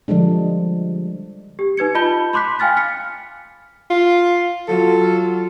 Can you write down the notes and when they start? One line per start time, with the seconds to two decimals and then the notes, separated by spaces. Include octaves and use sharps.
0.08 D3 F3 G3 G#3 D4
1.59 G4
1.77 D#4 B4 G#6 C#7
1.95 F4 D#5 A5 B5 G6 G7
2.33 B5 C6 D6 F#6 B6
2.59 F5 G5 G#5 F6 A6 B6
2.77 F6 B6 C#7
3.90 F4
4.68 F#3 F4 A4